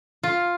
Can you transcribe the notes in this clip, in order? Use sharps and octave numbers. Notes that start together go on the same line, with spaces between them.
F4